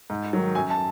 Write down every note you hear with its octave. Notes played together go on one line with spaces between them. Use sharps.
G#2
D#3 F#3
F#2 G#5
A5